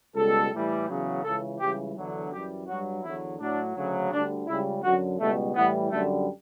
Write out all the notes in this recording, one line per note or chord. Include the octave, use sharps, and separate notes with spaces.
C#2 B2 G3 A4
A2 E3 G3
E2 C#3 F#3
C#2 C#3 E3 A4
C#2 C#3 E3 G3 G4
E2 D3 F#3
F#2 E3 G3 G4
G2 F#3 F#4
E2 D3 F#3 E4
A2 F#3 D4
D2 C#3 F#3
D2 D3 G3 D4
C#2 C#3 G3 E4
F#2 D3 F#3 F#4
C#2 B2 G3 A3
A2 E3 G3 B3
F#2 D3 G3 A3